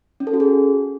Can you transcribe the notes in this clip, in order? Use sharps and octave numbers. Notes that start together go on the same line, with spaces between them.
C#4
A4
F#4
G#4